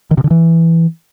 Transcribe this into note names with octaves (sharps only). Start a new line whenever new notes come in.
D#3
C3
D3
E3